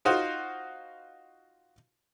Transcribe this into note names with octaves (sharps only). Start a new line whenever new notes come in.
D#4 F4 F#4 C5